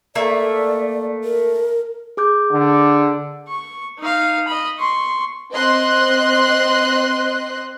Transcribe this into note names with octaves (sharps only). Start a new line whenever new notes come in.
A3 A#3 D5 E5
A#4
G#4 D6 G6
D3
C#6
D#4 F5
D#5 B5
C6 C#6
C4 C5 D#5 C6 F#6